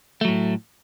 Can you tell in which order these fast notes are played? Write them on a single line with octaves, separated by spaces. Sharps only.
A3 F#3 A2